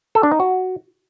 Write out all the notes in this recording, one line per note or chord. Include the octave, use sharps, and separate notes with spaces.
A4
D4
D#4
F#4